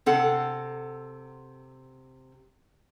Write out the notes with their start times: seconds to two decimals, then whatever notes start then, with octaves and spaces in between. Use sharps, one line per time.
0.06 C3 A4 F#5